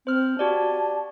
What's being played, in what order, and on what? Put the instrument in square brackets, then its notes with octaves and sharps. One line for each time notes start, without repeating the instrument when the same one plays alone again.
[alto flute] C4 [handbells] C5 F6
[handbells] F#4 G4 D5 [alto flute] A5